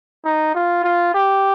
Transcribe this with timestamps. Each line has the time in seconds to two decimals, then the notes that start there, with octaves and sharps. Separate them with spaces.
0.25 D#4
0.55 F4
0.84 F4
1.14 G4